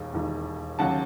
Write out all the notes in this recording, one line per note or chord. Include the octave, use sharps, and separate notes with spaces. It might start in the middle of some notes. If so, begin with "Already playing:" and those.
Already playing: E1 D#2 D#3
E1 D#2 D#3
D#2 C#3 F#3 F#5 A5